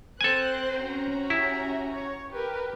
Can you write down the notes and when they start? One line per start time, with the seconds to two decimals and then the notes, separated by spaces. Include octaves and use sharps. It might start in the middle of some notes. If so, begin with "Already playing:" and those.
0.21 C4 A4 C5 G#5 F#6
0.77 C#4 F#4 A#5
1.30 E4 G4 E5
1.92 C#5
2.32 G4 A#4 B4